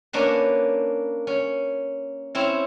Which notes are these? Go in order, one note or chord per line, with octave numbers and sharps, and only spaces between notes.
A#3 C#4 D4 B4
C#4
C4 C#4 E4